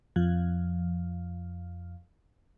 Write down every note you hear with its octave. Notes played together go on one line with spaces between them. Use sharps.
F2 F3